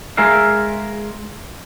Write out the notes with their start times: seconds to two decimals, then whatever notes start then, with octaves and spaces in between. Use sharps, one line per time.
0.17 G#3 G#4 A#4 E5 F5